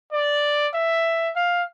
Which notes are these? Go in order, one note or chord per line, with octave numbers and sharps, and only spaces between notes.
D5
E5
F5